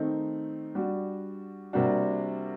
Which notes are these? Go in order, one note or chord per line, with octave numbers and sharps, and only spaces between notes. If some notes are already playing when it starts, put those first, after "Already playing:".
Already playing: D#3 A3 C4 D#4
G3 D4 F#4
C3 G3 A#3 D4 F#4